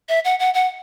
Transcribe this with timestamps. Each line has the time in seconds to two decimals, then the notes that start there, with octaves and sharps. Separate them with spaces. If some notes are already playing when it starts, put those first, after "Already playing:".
0.09 E5
0.25 F#5
0.39 F#5
0.54 F#5